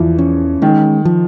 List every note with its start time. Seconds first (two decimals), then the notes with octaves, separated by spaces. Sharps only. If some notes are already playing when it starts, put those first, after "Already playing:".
Already playing: E2 E3 F3
0.19 C#4
0.62 D#3 G#3
1.05 F3